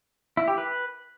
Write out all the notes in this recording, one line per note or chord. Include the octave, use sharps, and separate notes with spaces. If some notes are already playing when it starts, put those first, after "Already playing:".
E4
G4
B4